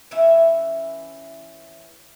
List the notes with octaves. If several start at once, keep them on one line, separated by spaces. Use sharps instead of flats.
E3 C#4 E5